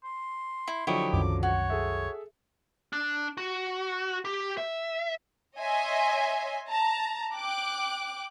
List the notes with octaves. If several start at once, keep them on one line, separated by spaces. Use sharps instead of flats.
C6
E4
D3 F3 F#3 E4 G4 D#5 C#6
C2 F#2 D#3 D6
F#4 C#5
G#4 A4 E5
D4
F#4
G4
E5
C#5 D#5 E5 G#5 C6
A5 A#5
G5 D6 F#6